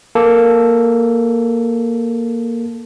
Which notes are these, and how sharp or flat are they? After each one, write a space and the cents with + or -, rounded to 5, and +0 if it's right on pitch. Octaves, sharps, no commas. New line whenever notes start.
A#3 +0 A4 +0